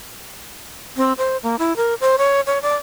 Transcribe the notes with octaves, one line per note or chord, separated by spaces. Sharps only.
C4
C5
A#3
E4
A#4
C5
C#5
C#5
D5